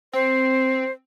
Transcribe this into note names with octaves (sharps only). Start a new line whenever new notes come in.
C4 C5